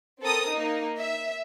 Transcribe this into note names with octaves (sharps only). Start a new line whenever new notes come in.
C4 A4 A#4 D#6
A#3 D#4
E5